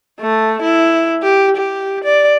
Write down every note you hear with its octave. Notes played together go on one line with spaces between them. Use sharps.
A3
E4
G4
G4
D5